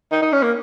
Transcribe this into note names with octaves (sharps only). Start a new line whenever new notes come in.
D#4
D#4
C#4
A#3